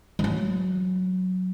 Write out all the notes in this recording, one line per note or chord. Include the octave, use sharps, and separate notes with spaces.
F3
F#3